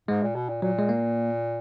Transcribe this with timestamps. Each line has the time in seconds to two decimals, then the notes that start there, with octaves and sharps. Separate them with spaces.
0.08 G#2 G#3
0.23 A#2
0.35 B2
0.50 A#2
0.62 A#2 F#3
0.79 G#3
0.89 A#3